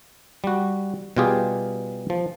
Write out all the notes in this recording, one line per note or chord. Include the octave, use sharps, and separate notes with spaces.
G3 F#4
B2 G3 F4 G4 G#4
F3